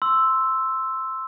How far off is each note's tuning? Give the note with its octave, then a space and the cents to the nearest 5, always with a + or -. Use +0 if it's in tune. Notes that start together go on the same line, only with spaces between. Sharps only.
C6 +0 E6 +0